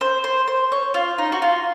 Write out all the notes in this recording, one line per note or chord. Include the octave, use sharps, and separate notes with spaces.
C5
C5
C5
C#5
F4
D#4
F#4
F4